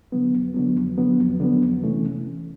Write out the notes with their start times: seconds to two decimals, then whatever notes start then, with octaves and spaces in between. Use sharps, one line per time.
0.12 D3 F#3 B3
0.33 F2
0.54 D3 F#3 B3
0.76 F2
0.98 D3 F#3 B3
1.19 F2
1.40 D3 F#3 B3
1.62 F2
1.83 C3 E3 A3 C#4